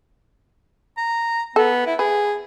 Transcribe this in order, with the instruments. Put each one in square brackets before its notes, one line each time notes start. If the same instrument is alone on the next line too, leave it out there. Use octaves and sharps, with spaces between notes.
[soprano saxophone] A#5
[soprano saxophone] B3 [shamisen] A4
[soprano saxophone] E4
[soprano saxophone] G#4 [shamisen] B4